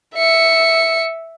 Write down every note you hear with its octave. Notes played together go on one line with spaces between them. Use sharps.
E5 C#7